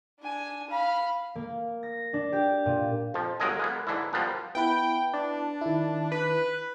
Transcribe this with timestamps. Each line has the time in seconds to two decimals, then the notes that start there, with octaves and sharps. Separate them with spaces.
0.20 D4 G#5
0.70 F5 B5
1.36 A#3
1.83 A#6
2.14 D4
2.32 G4
2.66 A#2
3.14 F2 F3
3.40 G1 F#3 G#3 A#4 D#5 G#5
3.59 G#3 A#3 B3
3.87 G#2 D3 E3 D4 E4
4.13 F3 G3 A#3 B3 D4
4.55 B3 E4 B4 G5
5.13 D4
5.61 D#3 E4
6.12 B4